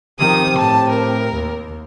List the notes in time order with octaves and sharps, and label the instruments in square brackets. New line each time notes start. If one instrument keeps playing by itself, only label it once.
[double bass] D#3 F3 [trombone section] C4 G4 [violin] D#6
[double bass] A2 [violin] A5
[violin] A#4
[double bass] D#2